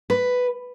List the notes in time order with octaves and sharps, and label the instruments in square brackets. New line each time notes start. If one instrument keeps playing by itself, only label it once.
[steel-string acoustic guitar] B4